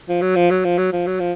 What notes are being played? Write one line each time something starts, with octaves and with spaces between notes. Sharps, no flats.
F3
F#3
F3
F#3
F3
F#3
F3
F#3
F3